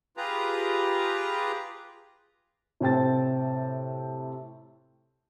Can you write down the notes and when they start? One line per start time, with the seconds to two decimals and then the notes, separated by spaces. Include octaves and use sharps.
0.17 F4 G4 G#4 B4 A#5
2.80 A2 C3 C4 G5 A5 A6